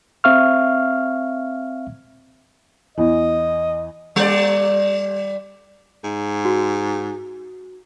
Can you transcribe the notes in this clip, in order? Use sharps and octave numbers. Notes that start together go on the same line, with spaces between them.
C4 E5 F5 C#6 F6
E2 E3 D#5
G3 D5
G#2
F#4